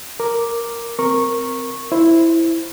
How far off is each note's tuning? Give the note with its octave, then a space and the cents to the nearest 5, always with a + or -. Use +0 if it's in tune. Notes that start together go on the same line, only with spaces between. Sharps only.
A#4 +0 D6 +0
C4 -10 A#4 +0 C#6 -15
E4 +0 C5 +5